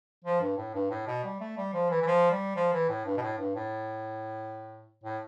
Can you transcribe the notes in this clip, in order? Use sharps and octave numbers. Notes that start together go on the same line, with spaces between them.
F3
G2
A2
G2
A2
B2
G3
A3
G3
F3
E3
E3
F3
G3
F3
E3
A2
G2
B2
A2
G2
A2
A2